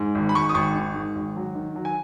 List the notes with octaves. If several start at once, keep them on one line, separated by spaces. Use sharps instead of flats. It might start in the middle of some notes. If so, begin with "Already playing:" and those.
Already playing: G#2
G#1
B5
G#2 C#6
D#6
G#1 C#6
D#3
G#2
G#1
F#3
D#3
F#3
G#5